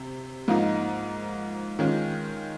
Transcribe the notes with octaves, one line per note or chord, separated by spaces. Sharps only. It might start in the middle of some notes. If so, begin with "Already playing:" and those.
Already playing: C3
G#2 F3 A#3 D#4
D#3 G#3 C#4 F4